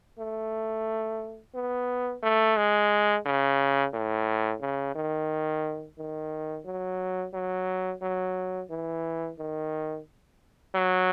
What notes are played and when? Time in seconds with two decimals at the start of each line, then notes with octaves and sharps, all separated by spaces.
0.19 A3
1.55 B3
2.23 A3
2.57 G#3
3.26 C#3
3.93 A2
4.61 C#3
4.95 D#3
5.98 D#3
6.65 F#3
7.33 F#3
8.02 F#3
8.70 E3
9.38 D#3
10.74 F#3